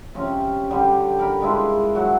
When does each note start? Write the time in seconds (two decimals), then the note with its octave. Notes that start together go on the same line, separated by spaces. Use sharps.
0.15 C3 F3 C#4
0.71 D3 G3 G4
1.19 A#4 B5
1.42 G#3 D4 E4 F4
1.95 F#3 F#4